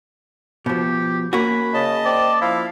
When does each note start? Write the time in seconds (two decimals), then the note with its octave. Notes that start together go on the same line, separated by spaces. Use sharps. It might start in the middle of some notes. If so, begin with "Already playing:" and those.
0.66 B2 F3 G4
1.33 A#3 C#4 F#4 B5
1.74 C#3 D#5 A5
2.05 C4 D5
2.41 F3 E4 F5